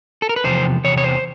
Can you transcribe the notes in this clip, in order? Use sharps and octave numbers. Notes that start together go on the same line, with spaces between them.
A4
A#4
B4
E2 C3 F3 C5
E2 C3 C#5
C#5
C5